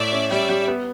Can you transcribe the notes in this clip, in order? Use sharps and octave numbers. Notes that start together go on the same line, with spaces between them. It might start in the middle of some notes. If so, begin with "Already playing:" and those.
Already playing: A2 D5 E5
C#4
G3 D5 E5
G3
B3